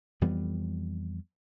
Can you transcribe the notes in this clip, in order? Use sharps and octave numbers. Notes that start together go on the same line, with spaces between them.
F2 E3 G3 B3